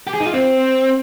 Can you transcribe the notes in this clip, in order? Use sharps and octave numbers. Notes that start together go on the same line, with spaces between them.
G4
G#4
D#4
F4
C4